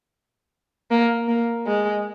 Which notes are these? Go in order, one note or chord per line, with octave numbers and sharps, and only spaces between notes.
A#3
A#3
G#3